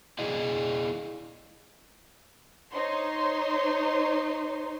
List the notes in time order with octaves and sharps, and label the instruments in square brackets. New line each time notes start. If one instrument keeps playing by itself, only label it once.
[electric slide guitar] E4 G#4 D5 D#5
[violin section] D#4 C5 C#5 C6